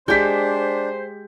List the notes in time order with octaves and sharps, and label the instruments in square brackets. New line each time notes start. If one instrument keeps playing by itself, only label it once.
[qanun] G#3 G4 [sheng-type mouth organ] D4 [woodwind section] C5 [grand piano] G6 B6